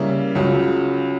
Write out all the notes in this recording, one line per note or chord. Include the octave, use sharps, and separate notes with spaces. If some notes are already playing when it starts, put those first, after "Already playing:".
Already playing: C#3 G3 A#3 E4
C#2 C#3 F#3